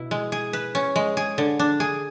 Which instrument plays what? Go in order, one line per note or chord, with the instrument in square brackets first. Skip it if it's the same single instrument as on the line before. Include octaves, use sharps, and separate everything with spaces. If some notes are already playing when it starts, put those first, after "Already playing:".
Already playing: [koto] B2 E4
G#3
G#4
B4
C#4
G#3
G#4
D3
D4
G#4